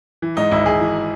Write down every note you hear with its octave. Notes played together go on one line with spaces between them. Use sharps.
E3
G#2 D#4
G#1 E4
G#1 G#4
E3